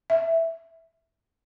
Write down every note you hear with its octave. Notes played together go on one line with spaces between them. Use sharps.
E5